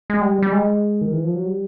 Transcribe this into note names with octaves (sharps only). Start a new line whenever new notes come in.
G#3
G3
G3
G#3
D#3
E3
F3
F#3
G3